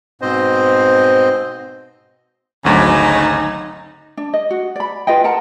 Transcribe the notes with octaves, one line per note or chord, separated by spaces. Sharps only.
G#2 B2 C4 C5 D#5
G#1 D2 C#3 F#3 D#4
D4
D#5
F#4
D5 B5
F4 B4 D#5 G5
A#4 F#5 A5 A#5